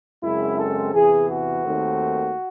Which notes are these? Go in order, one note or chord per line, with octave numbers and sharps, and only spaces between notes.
F#2 C#3 G#3 C4 E4
A4
E2 C3 E3 G#4
F#4
D#2 D#3 A3 C4